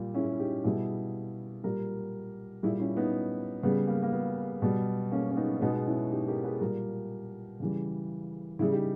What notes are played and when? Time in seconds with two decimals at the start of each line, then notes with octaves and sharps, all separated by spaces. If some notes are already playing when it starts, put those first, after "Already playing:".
Already playing: A#2 G3
0.14 C#4 E4
0.39 D#4 G4
0.64 B2 G3 E4 G#4
1.64 A#2 G3 G4 A#4
2.63 A#2 G3 E4 G#4
2.80 C#4 E4
2.97 B3 D#4
3.63 C#3 G3 B3
3.87 A#3
4.03 A#3
4.12 B3
4.62 B2 G3
5.11 A#3 C#4
5.30 C#4
5.36 B3 D#4
5.57 C#4
5.62 B2 G#3 B3 D#4
5.87 C#4 E4
6.11 D#4 G4
6.28 G4 A#4
6.44 G#4 B4
6.61 A#2 G3 G4 A#4
7.60 C#3 E3 G3
8.59 C#3 G3 E4 G#4
8.72 D#4 G4